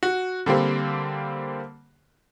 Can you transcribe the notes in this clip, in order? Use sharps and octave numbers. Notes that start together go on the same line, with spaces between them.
F#4
D3 G3 A#3 C4